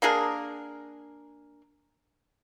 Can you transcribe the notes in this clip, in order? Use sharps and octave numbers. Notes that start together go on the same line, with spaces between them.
A#3 D4 G#4 A#4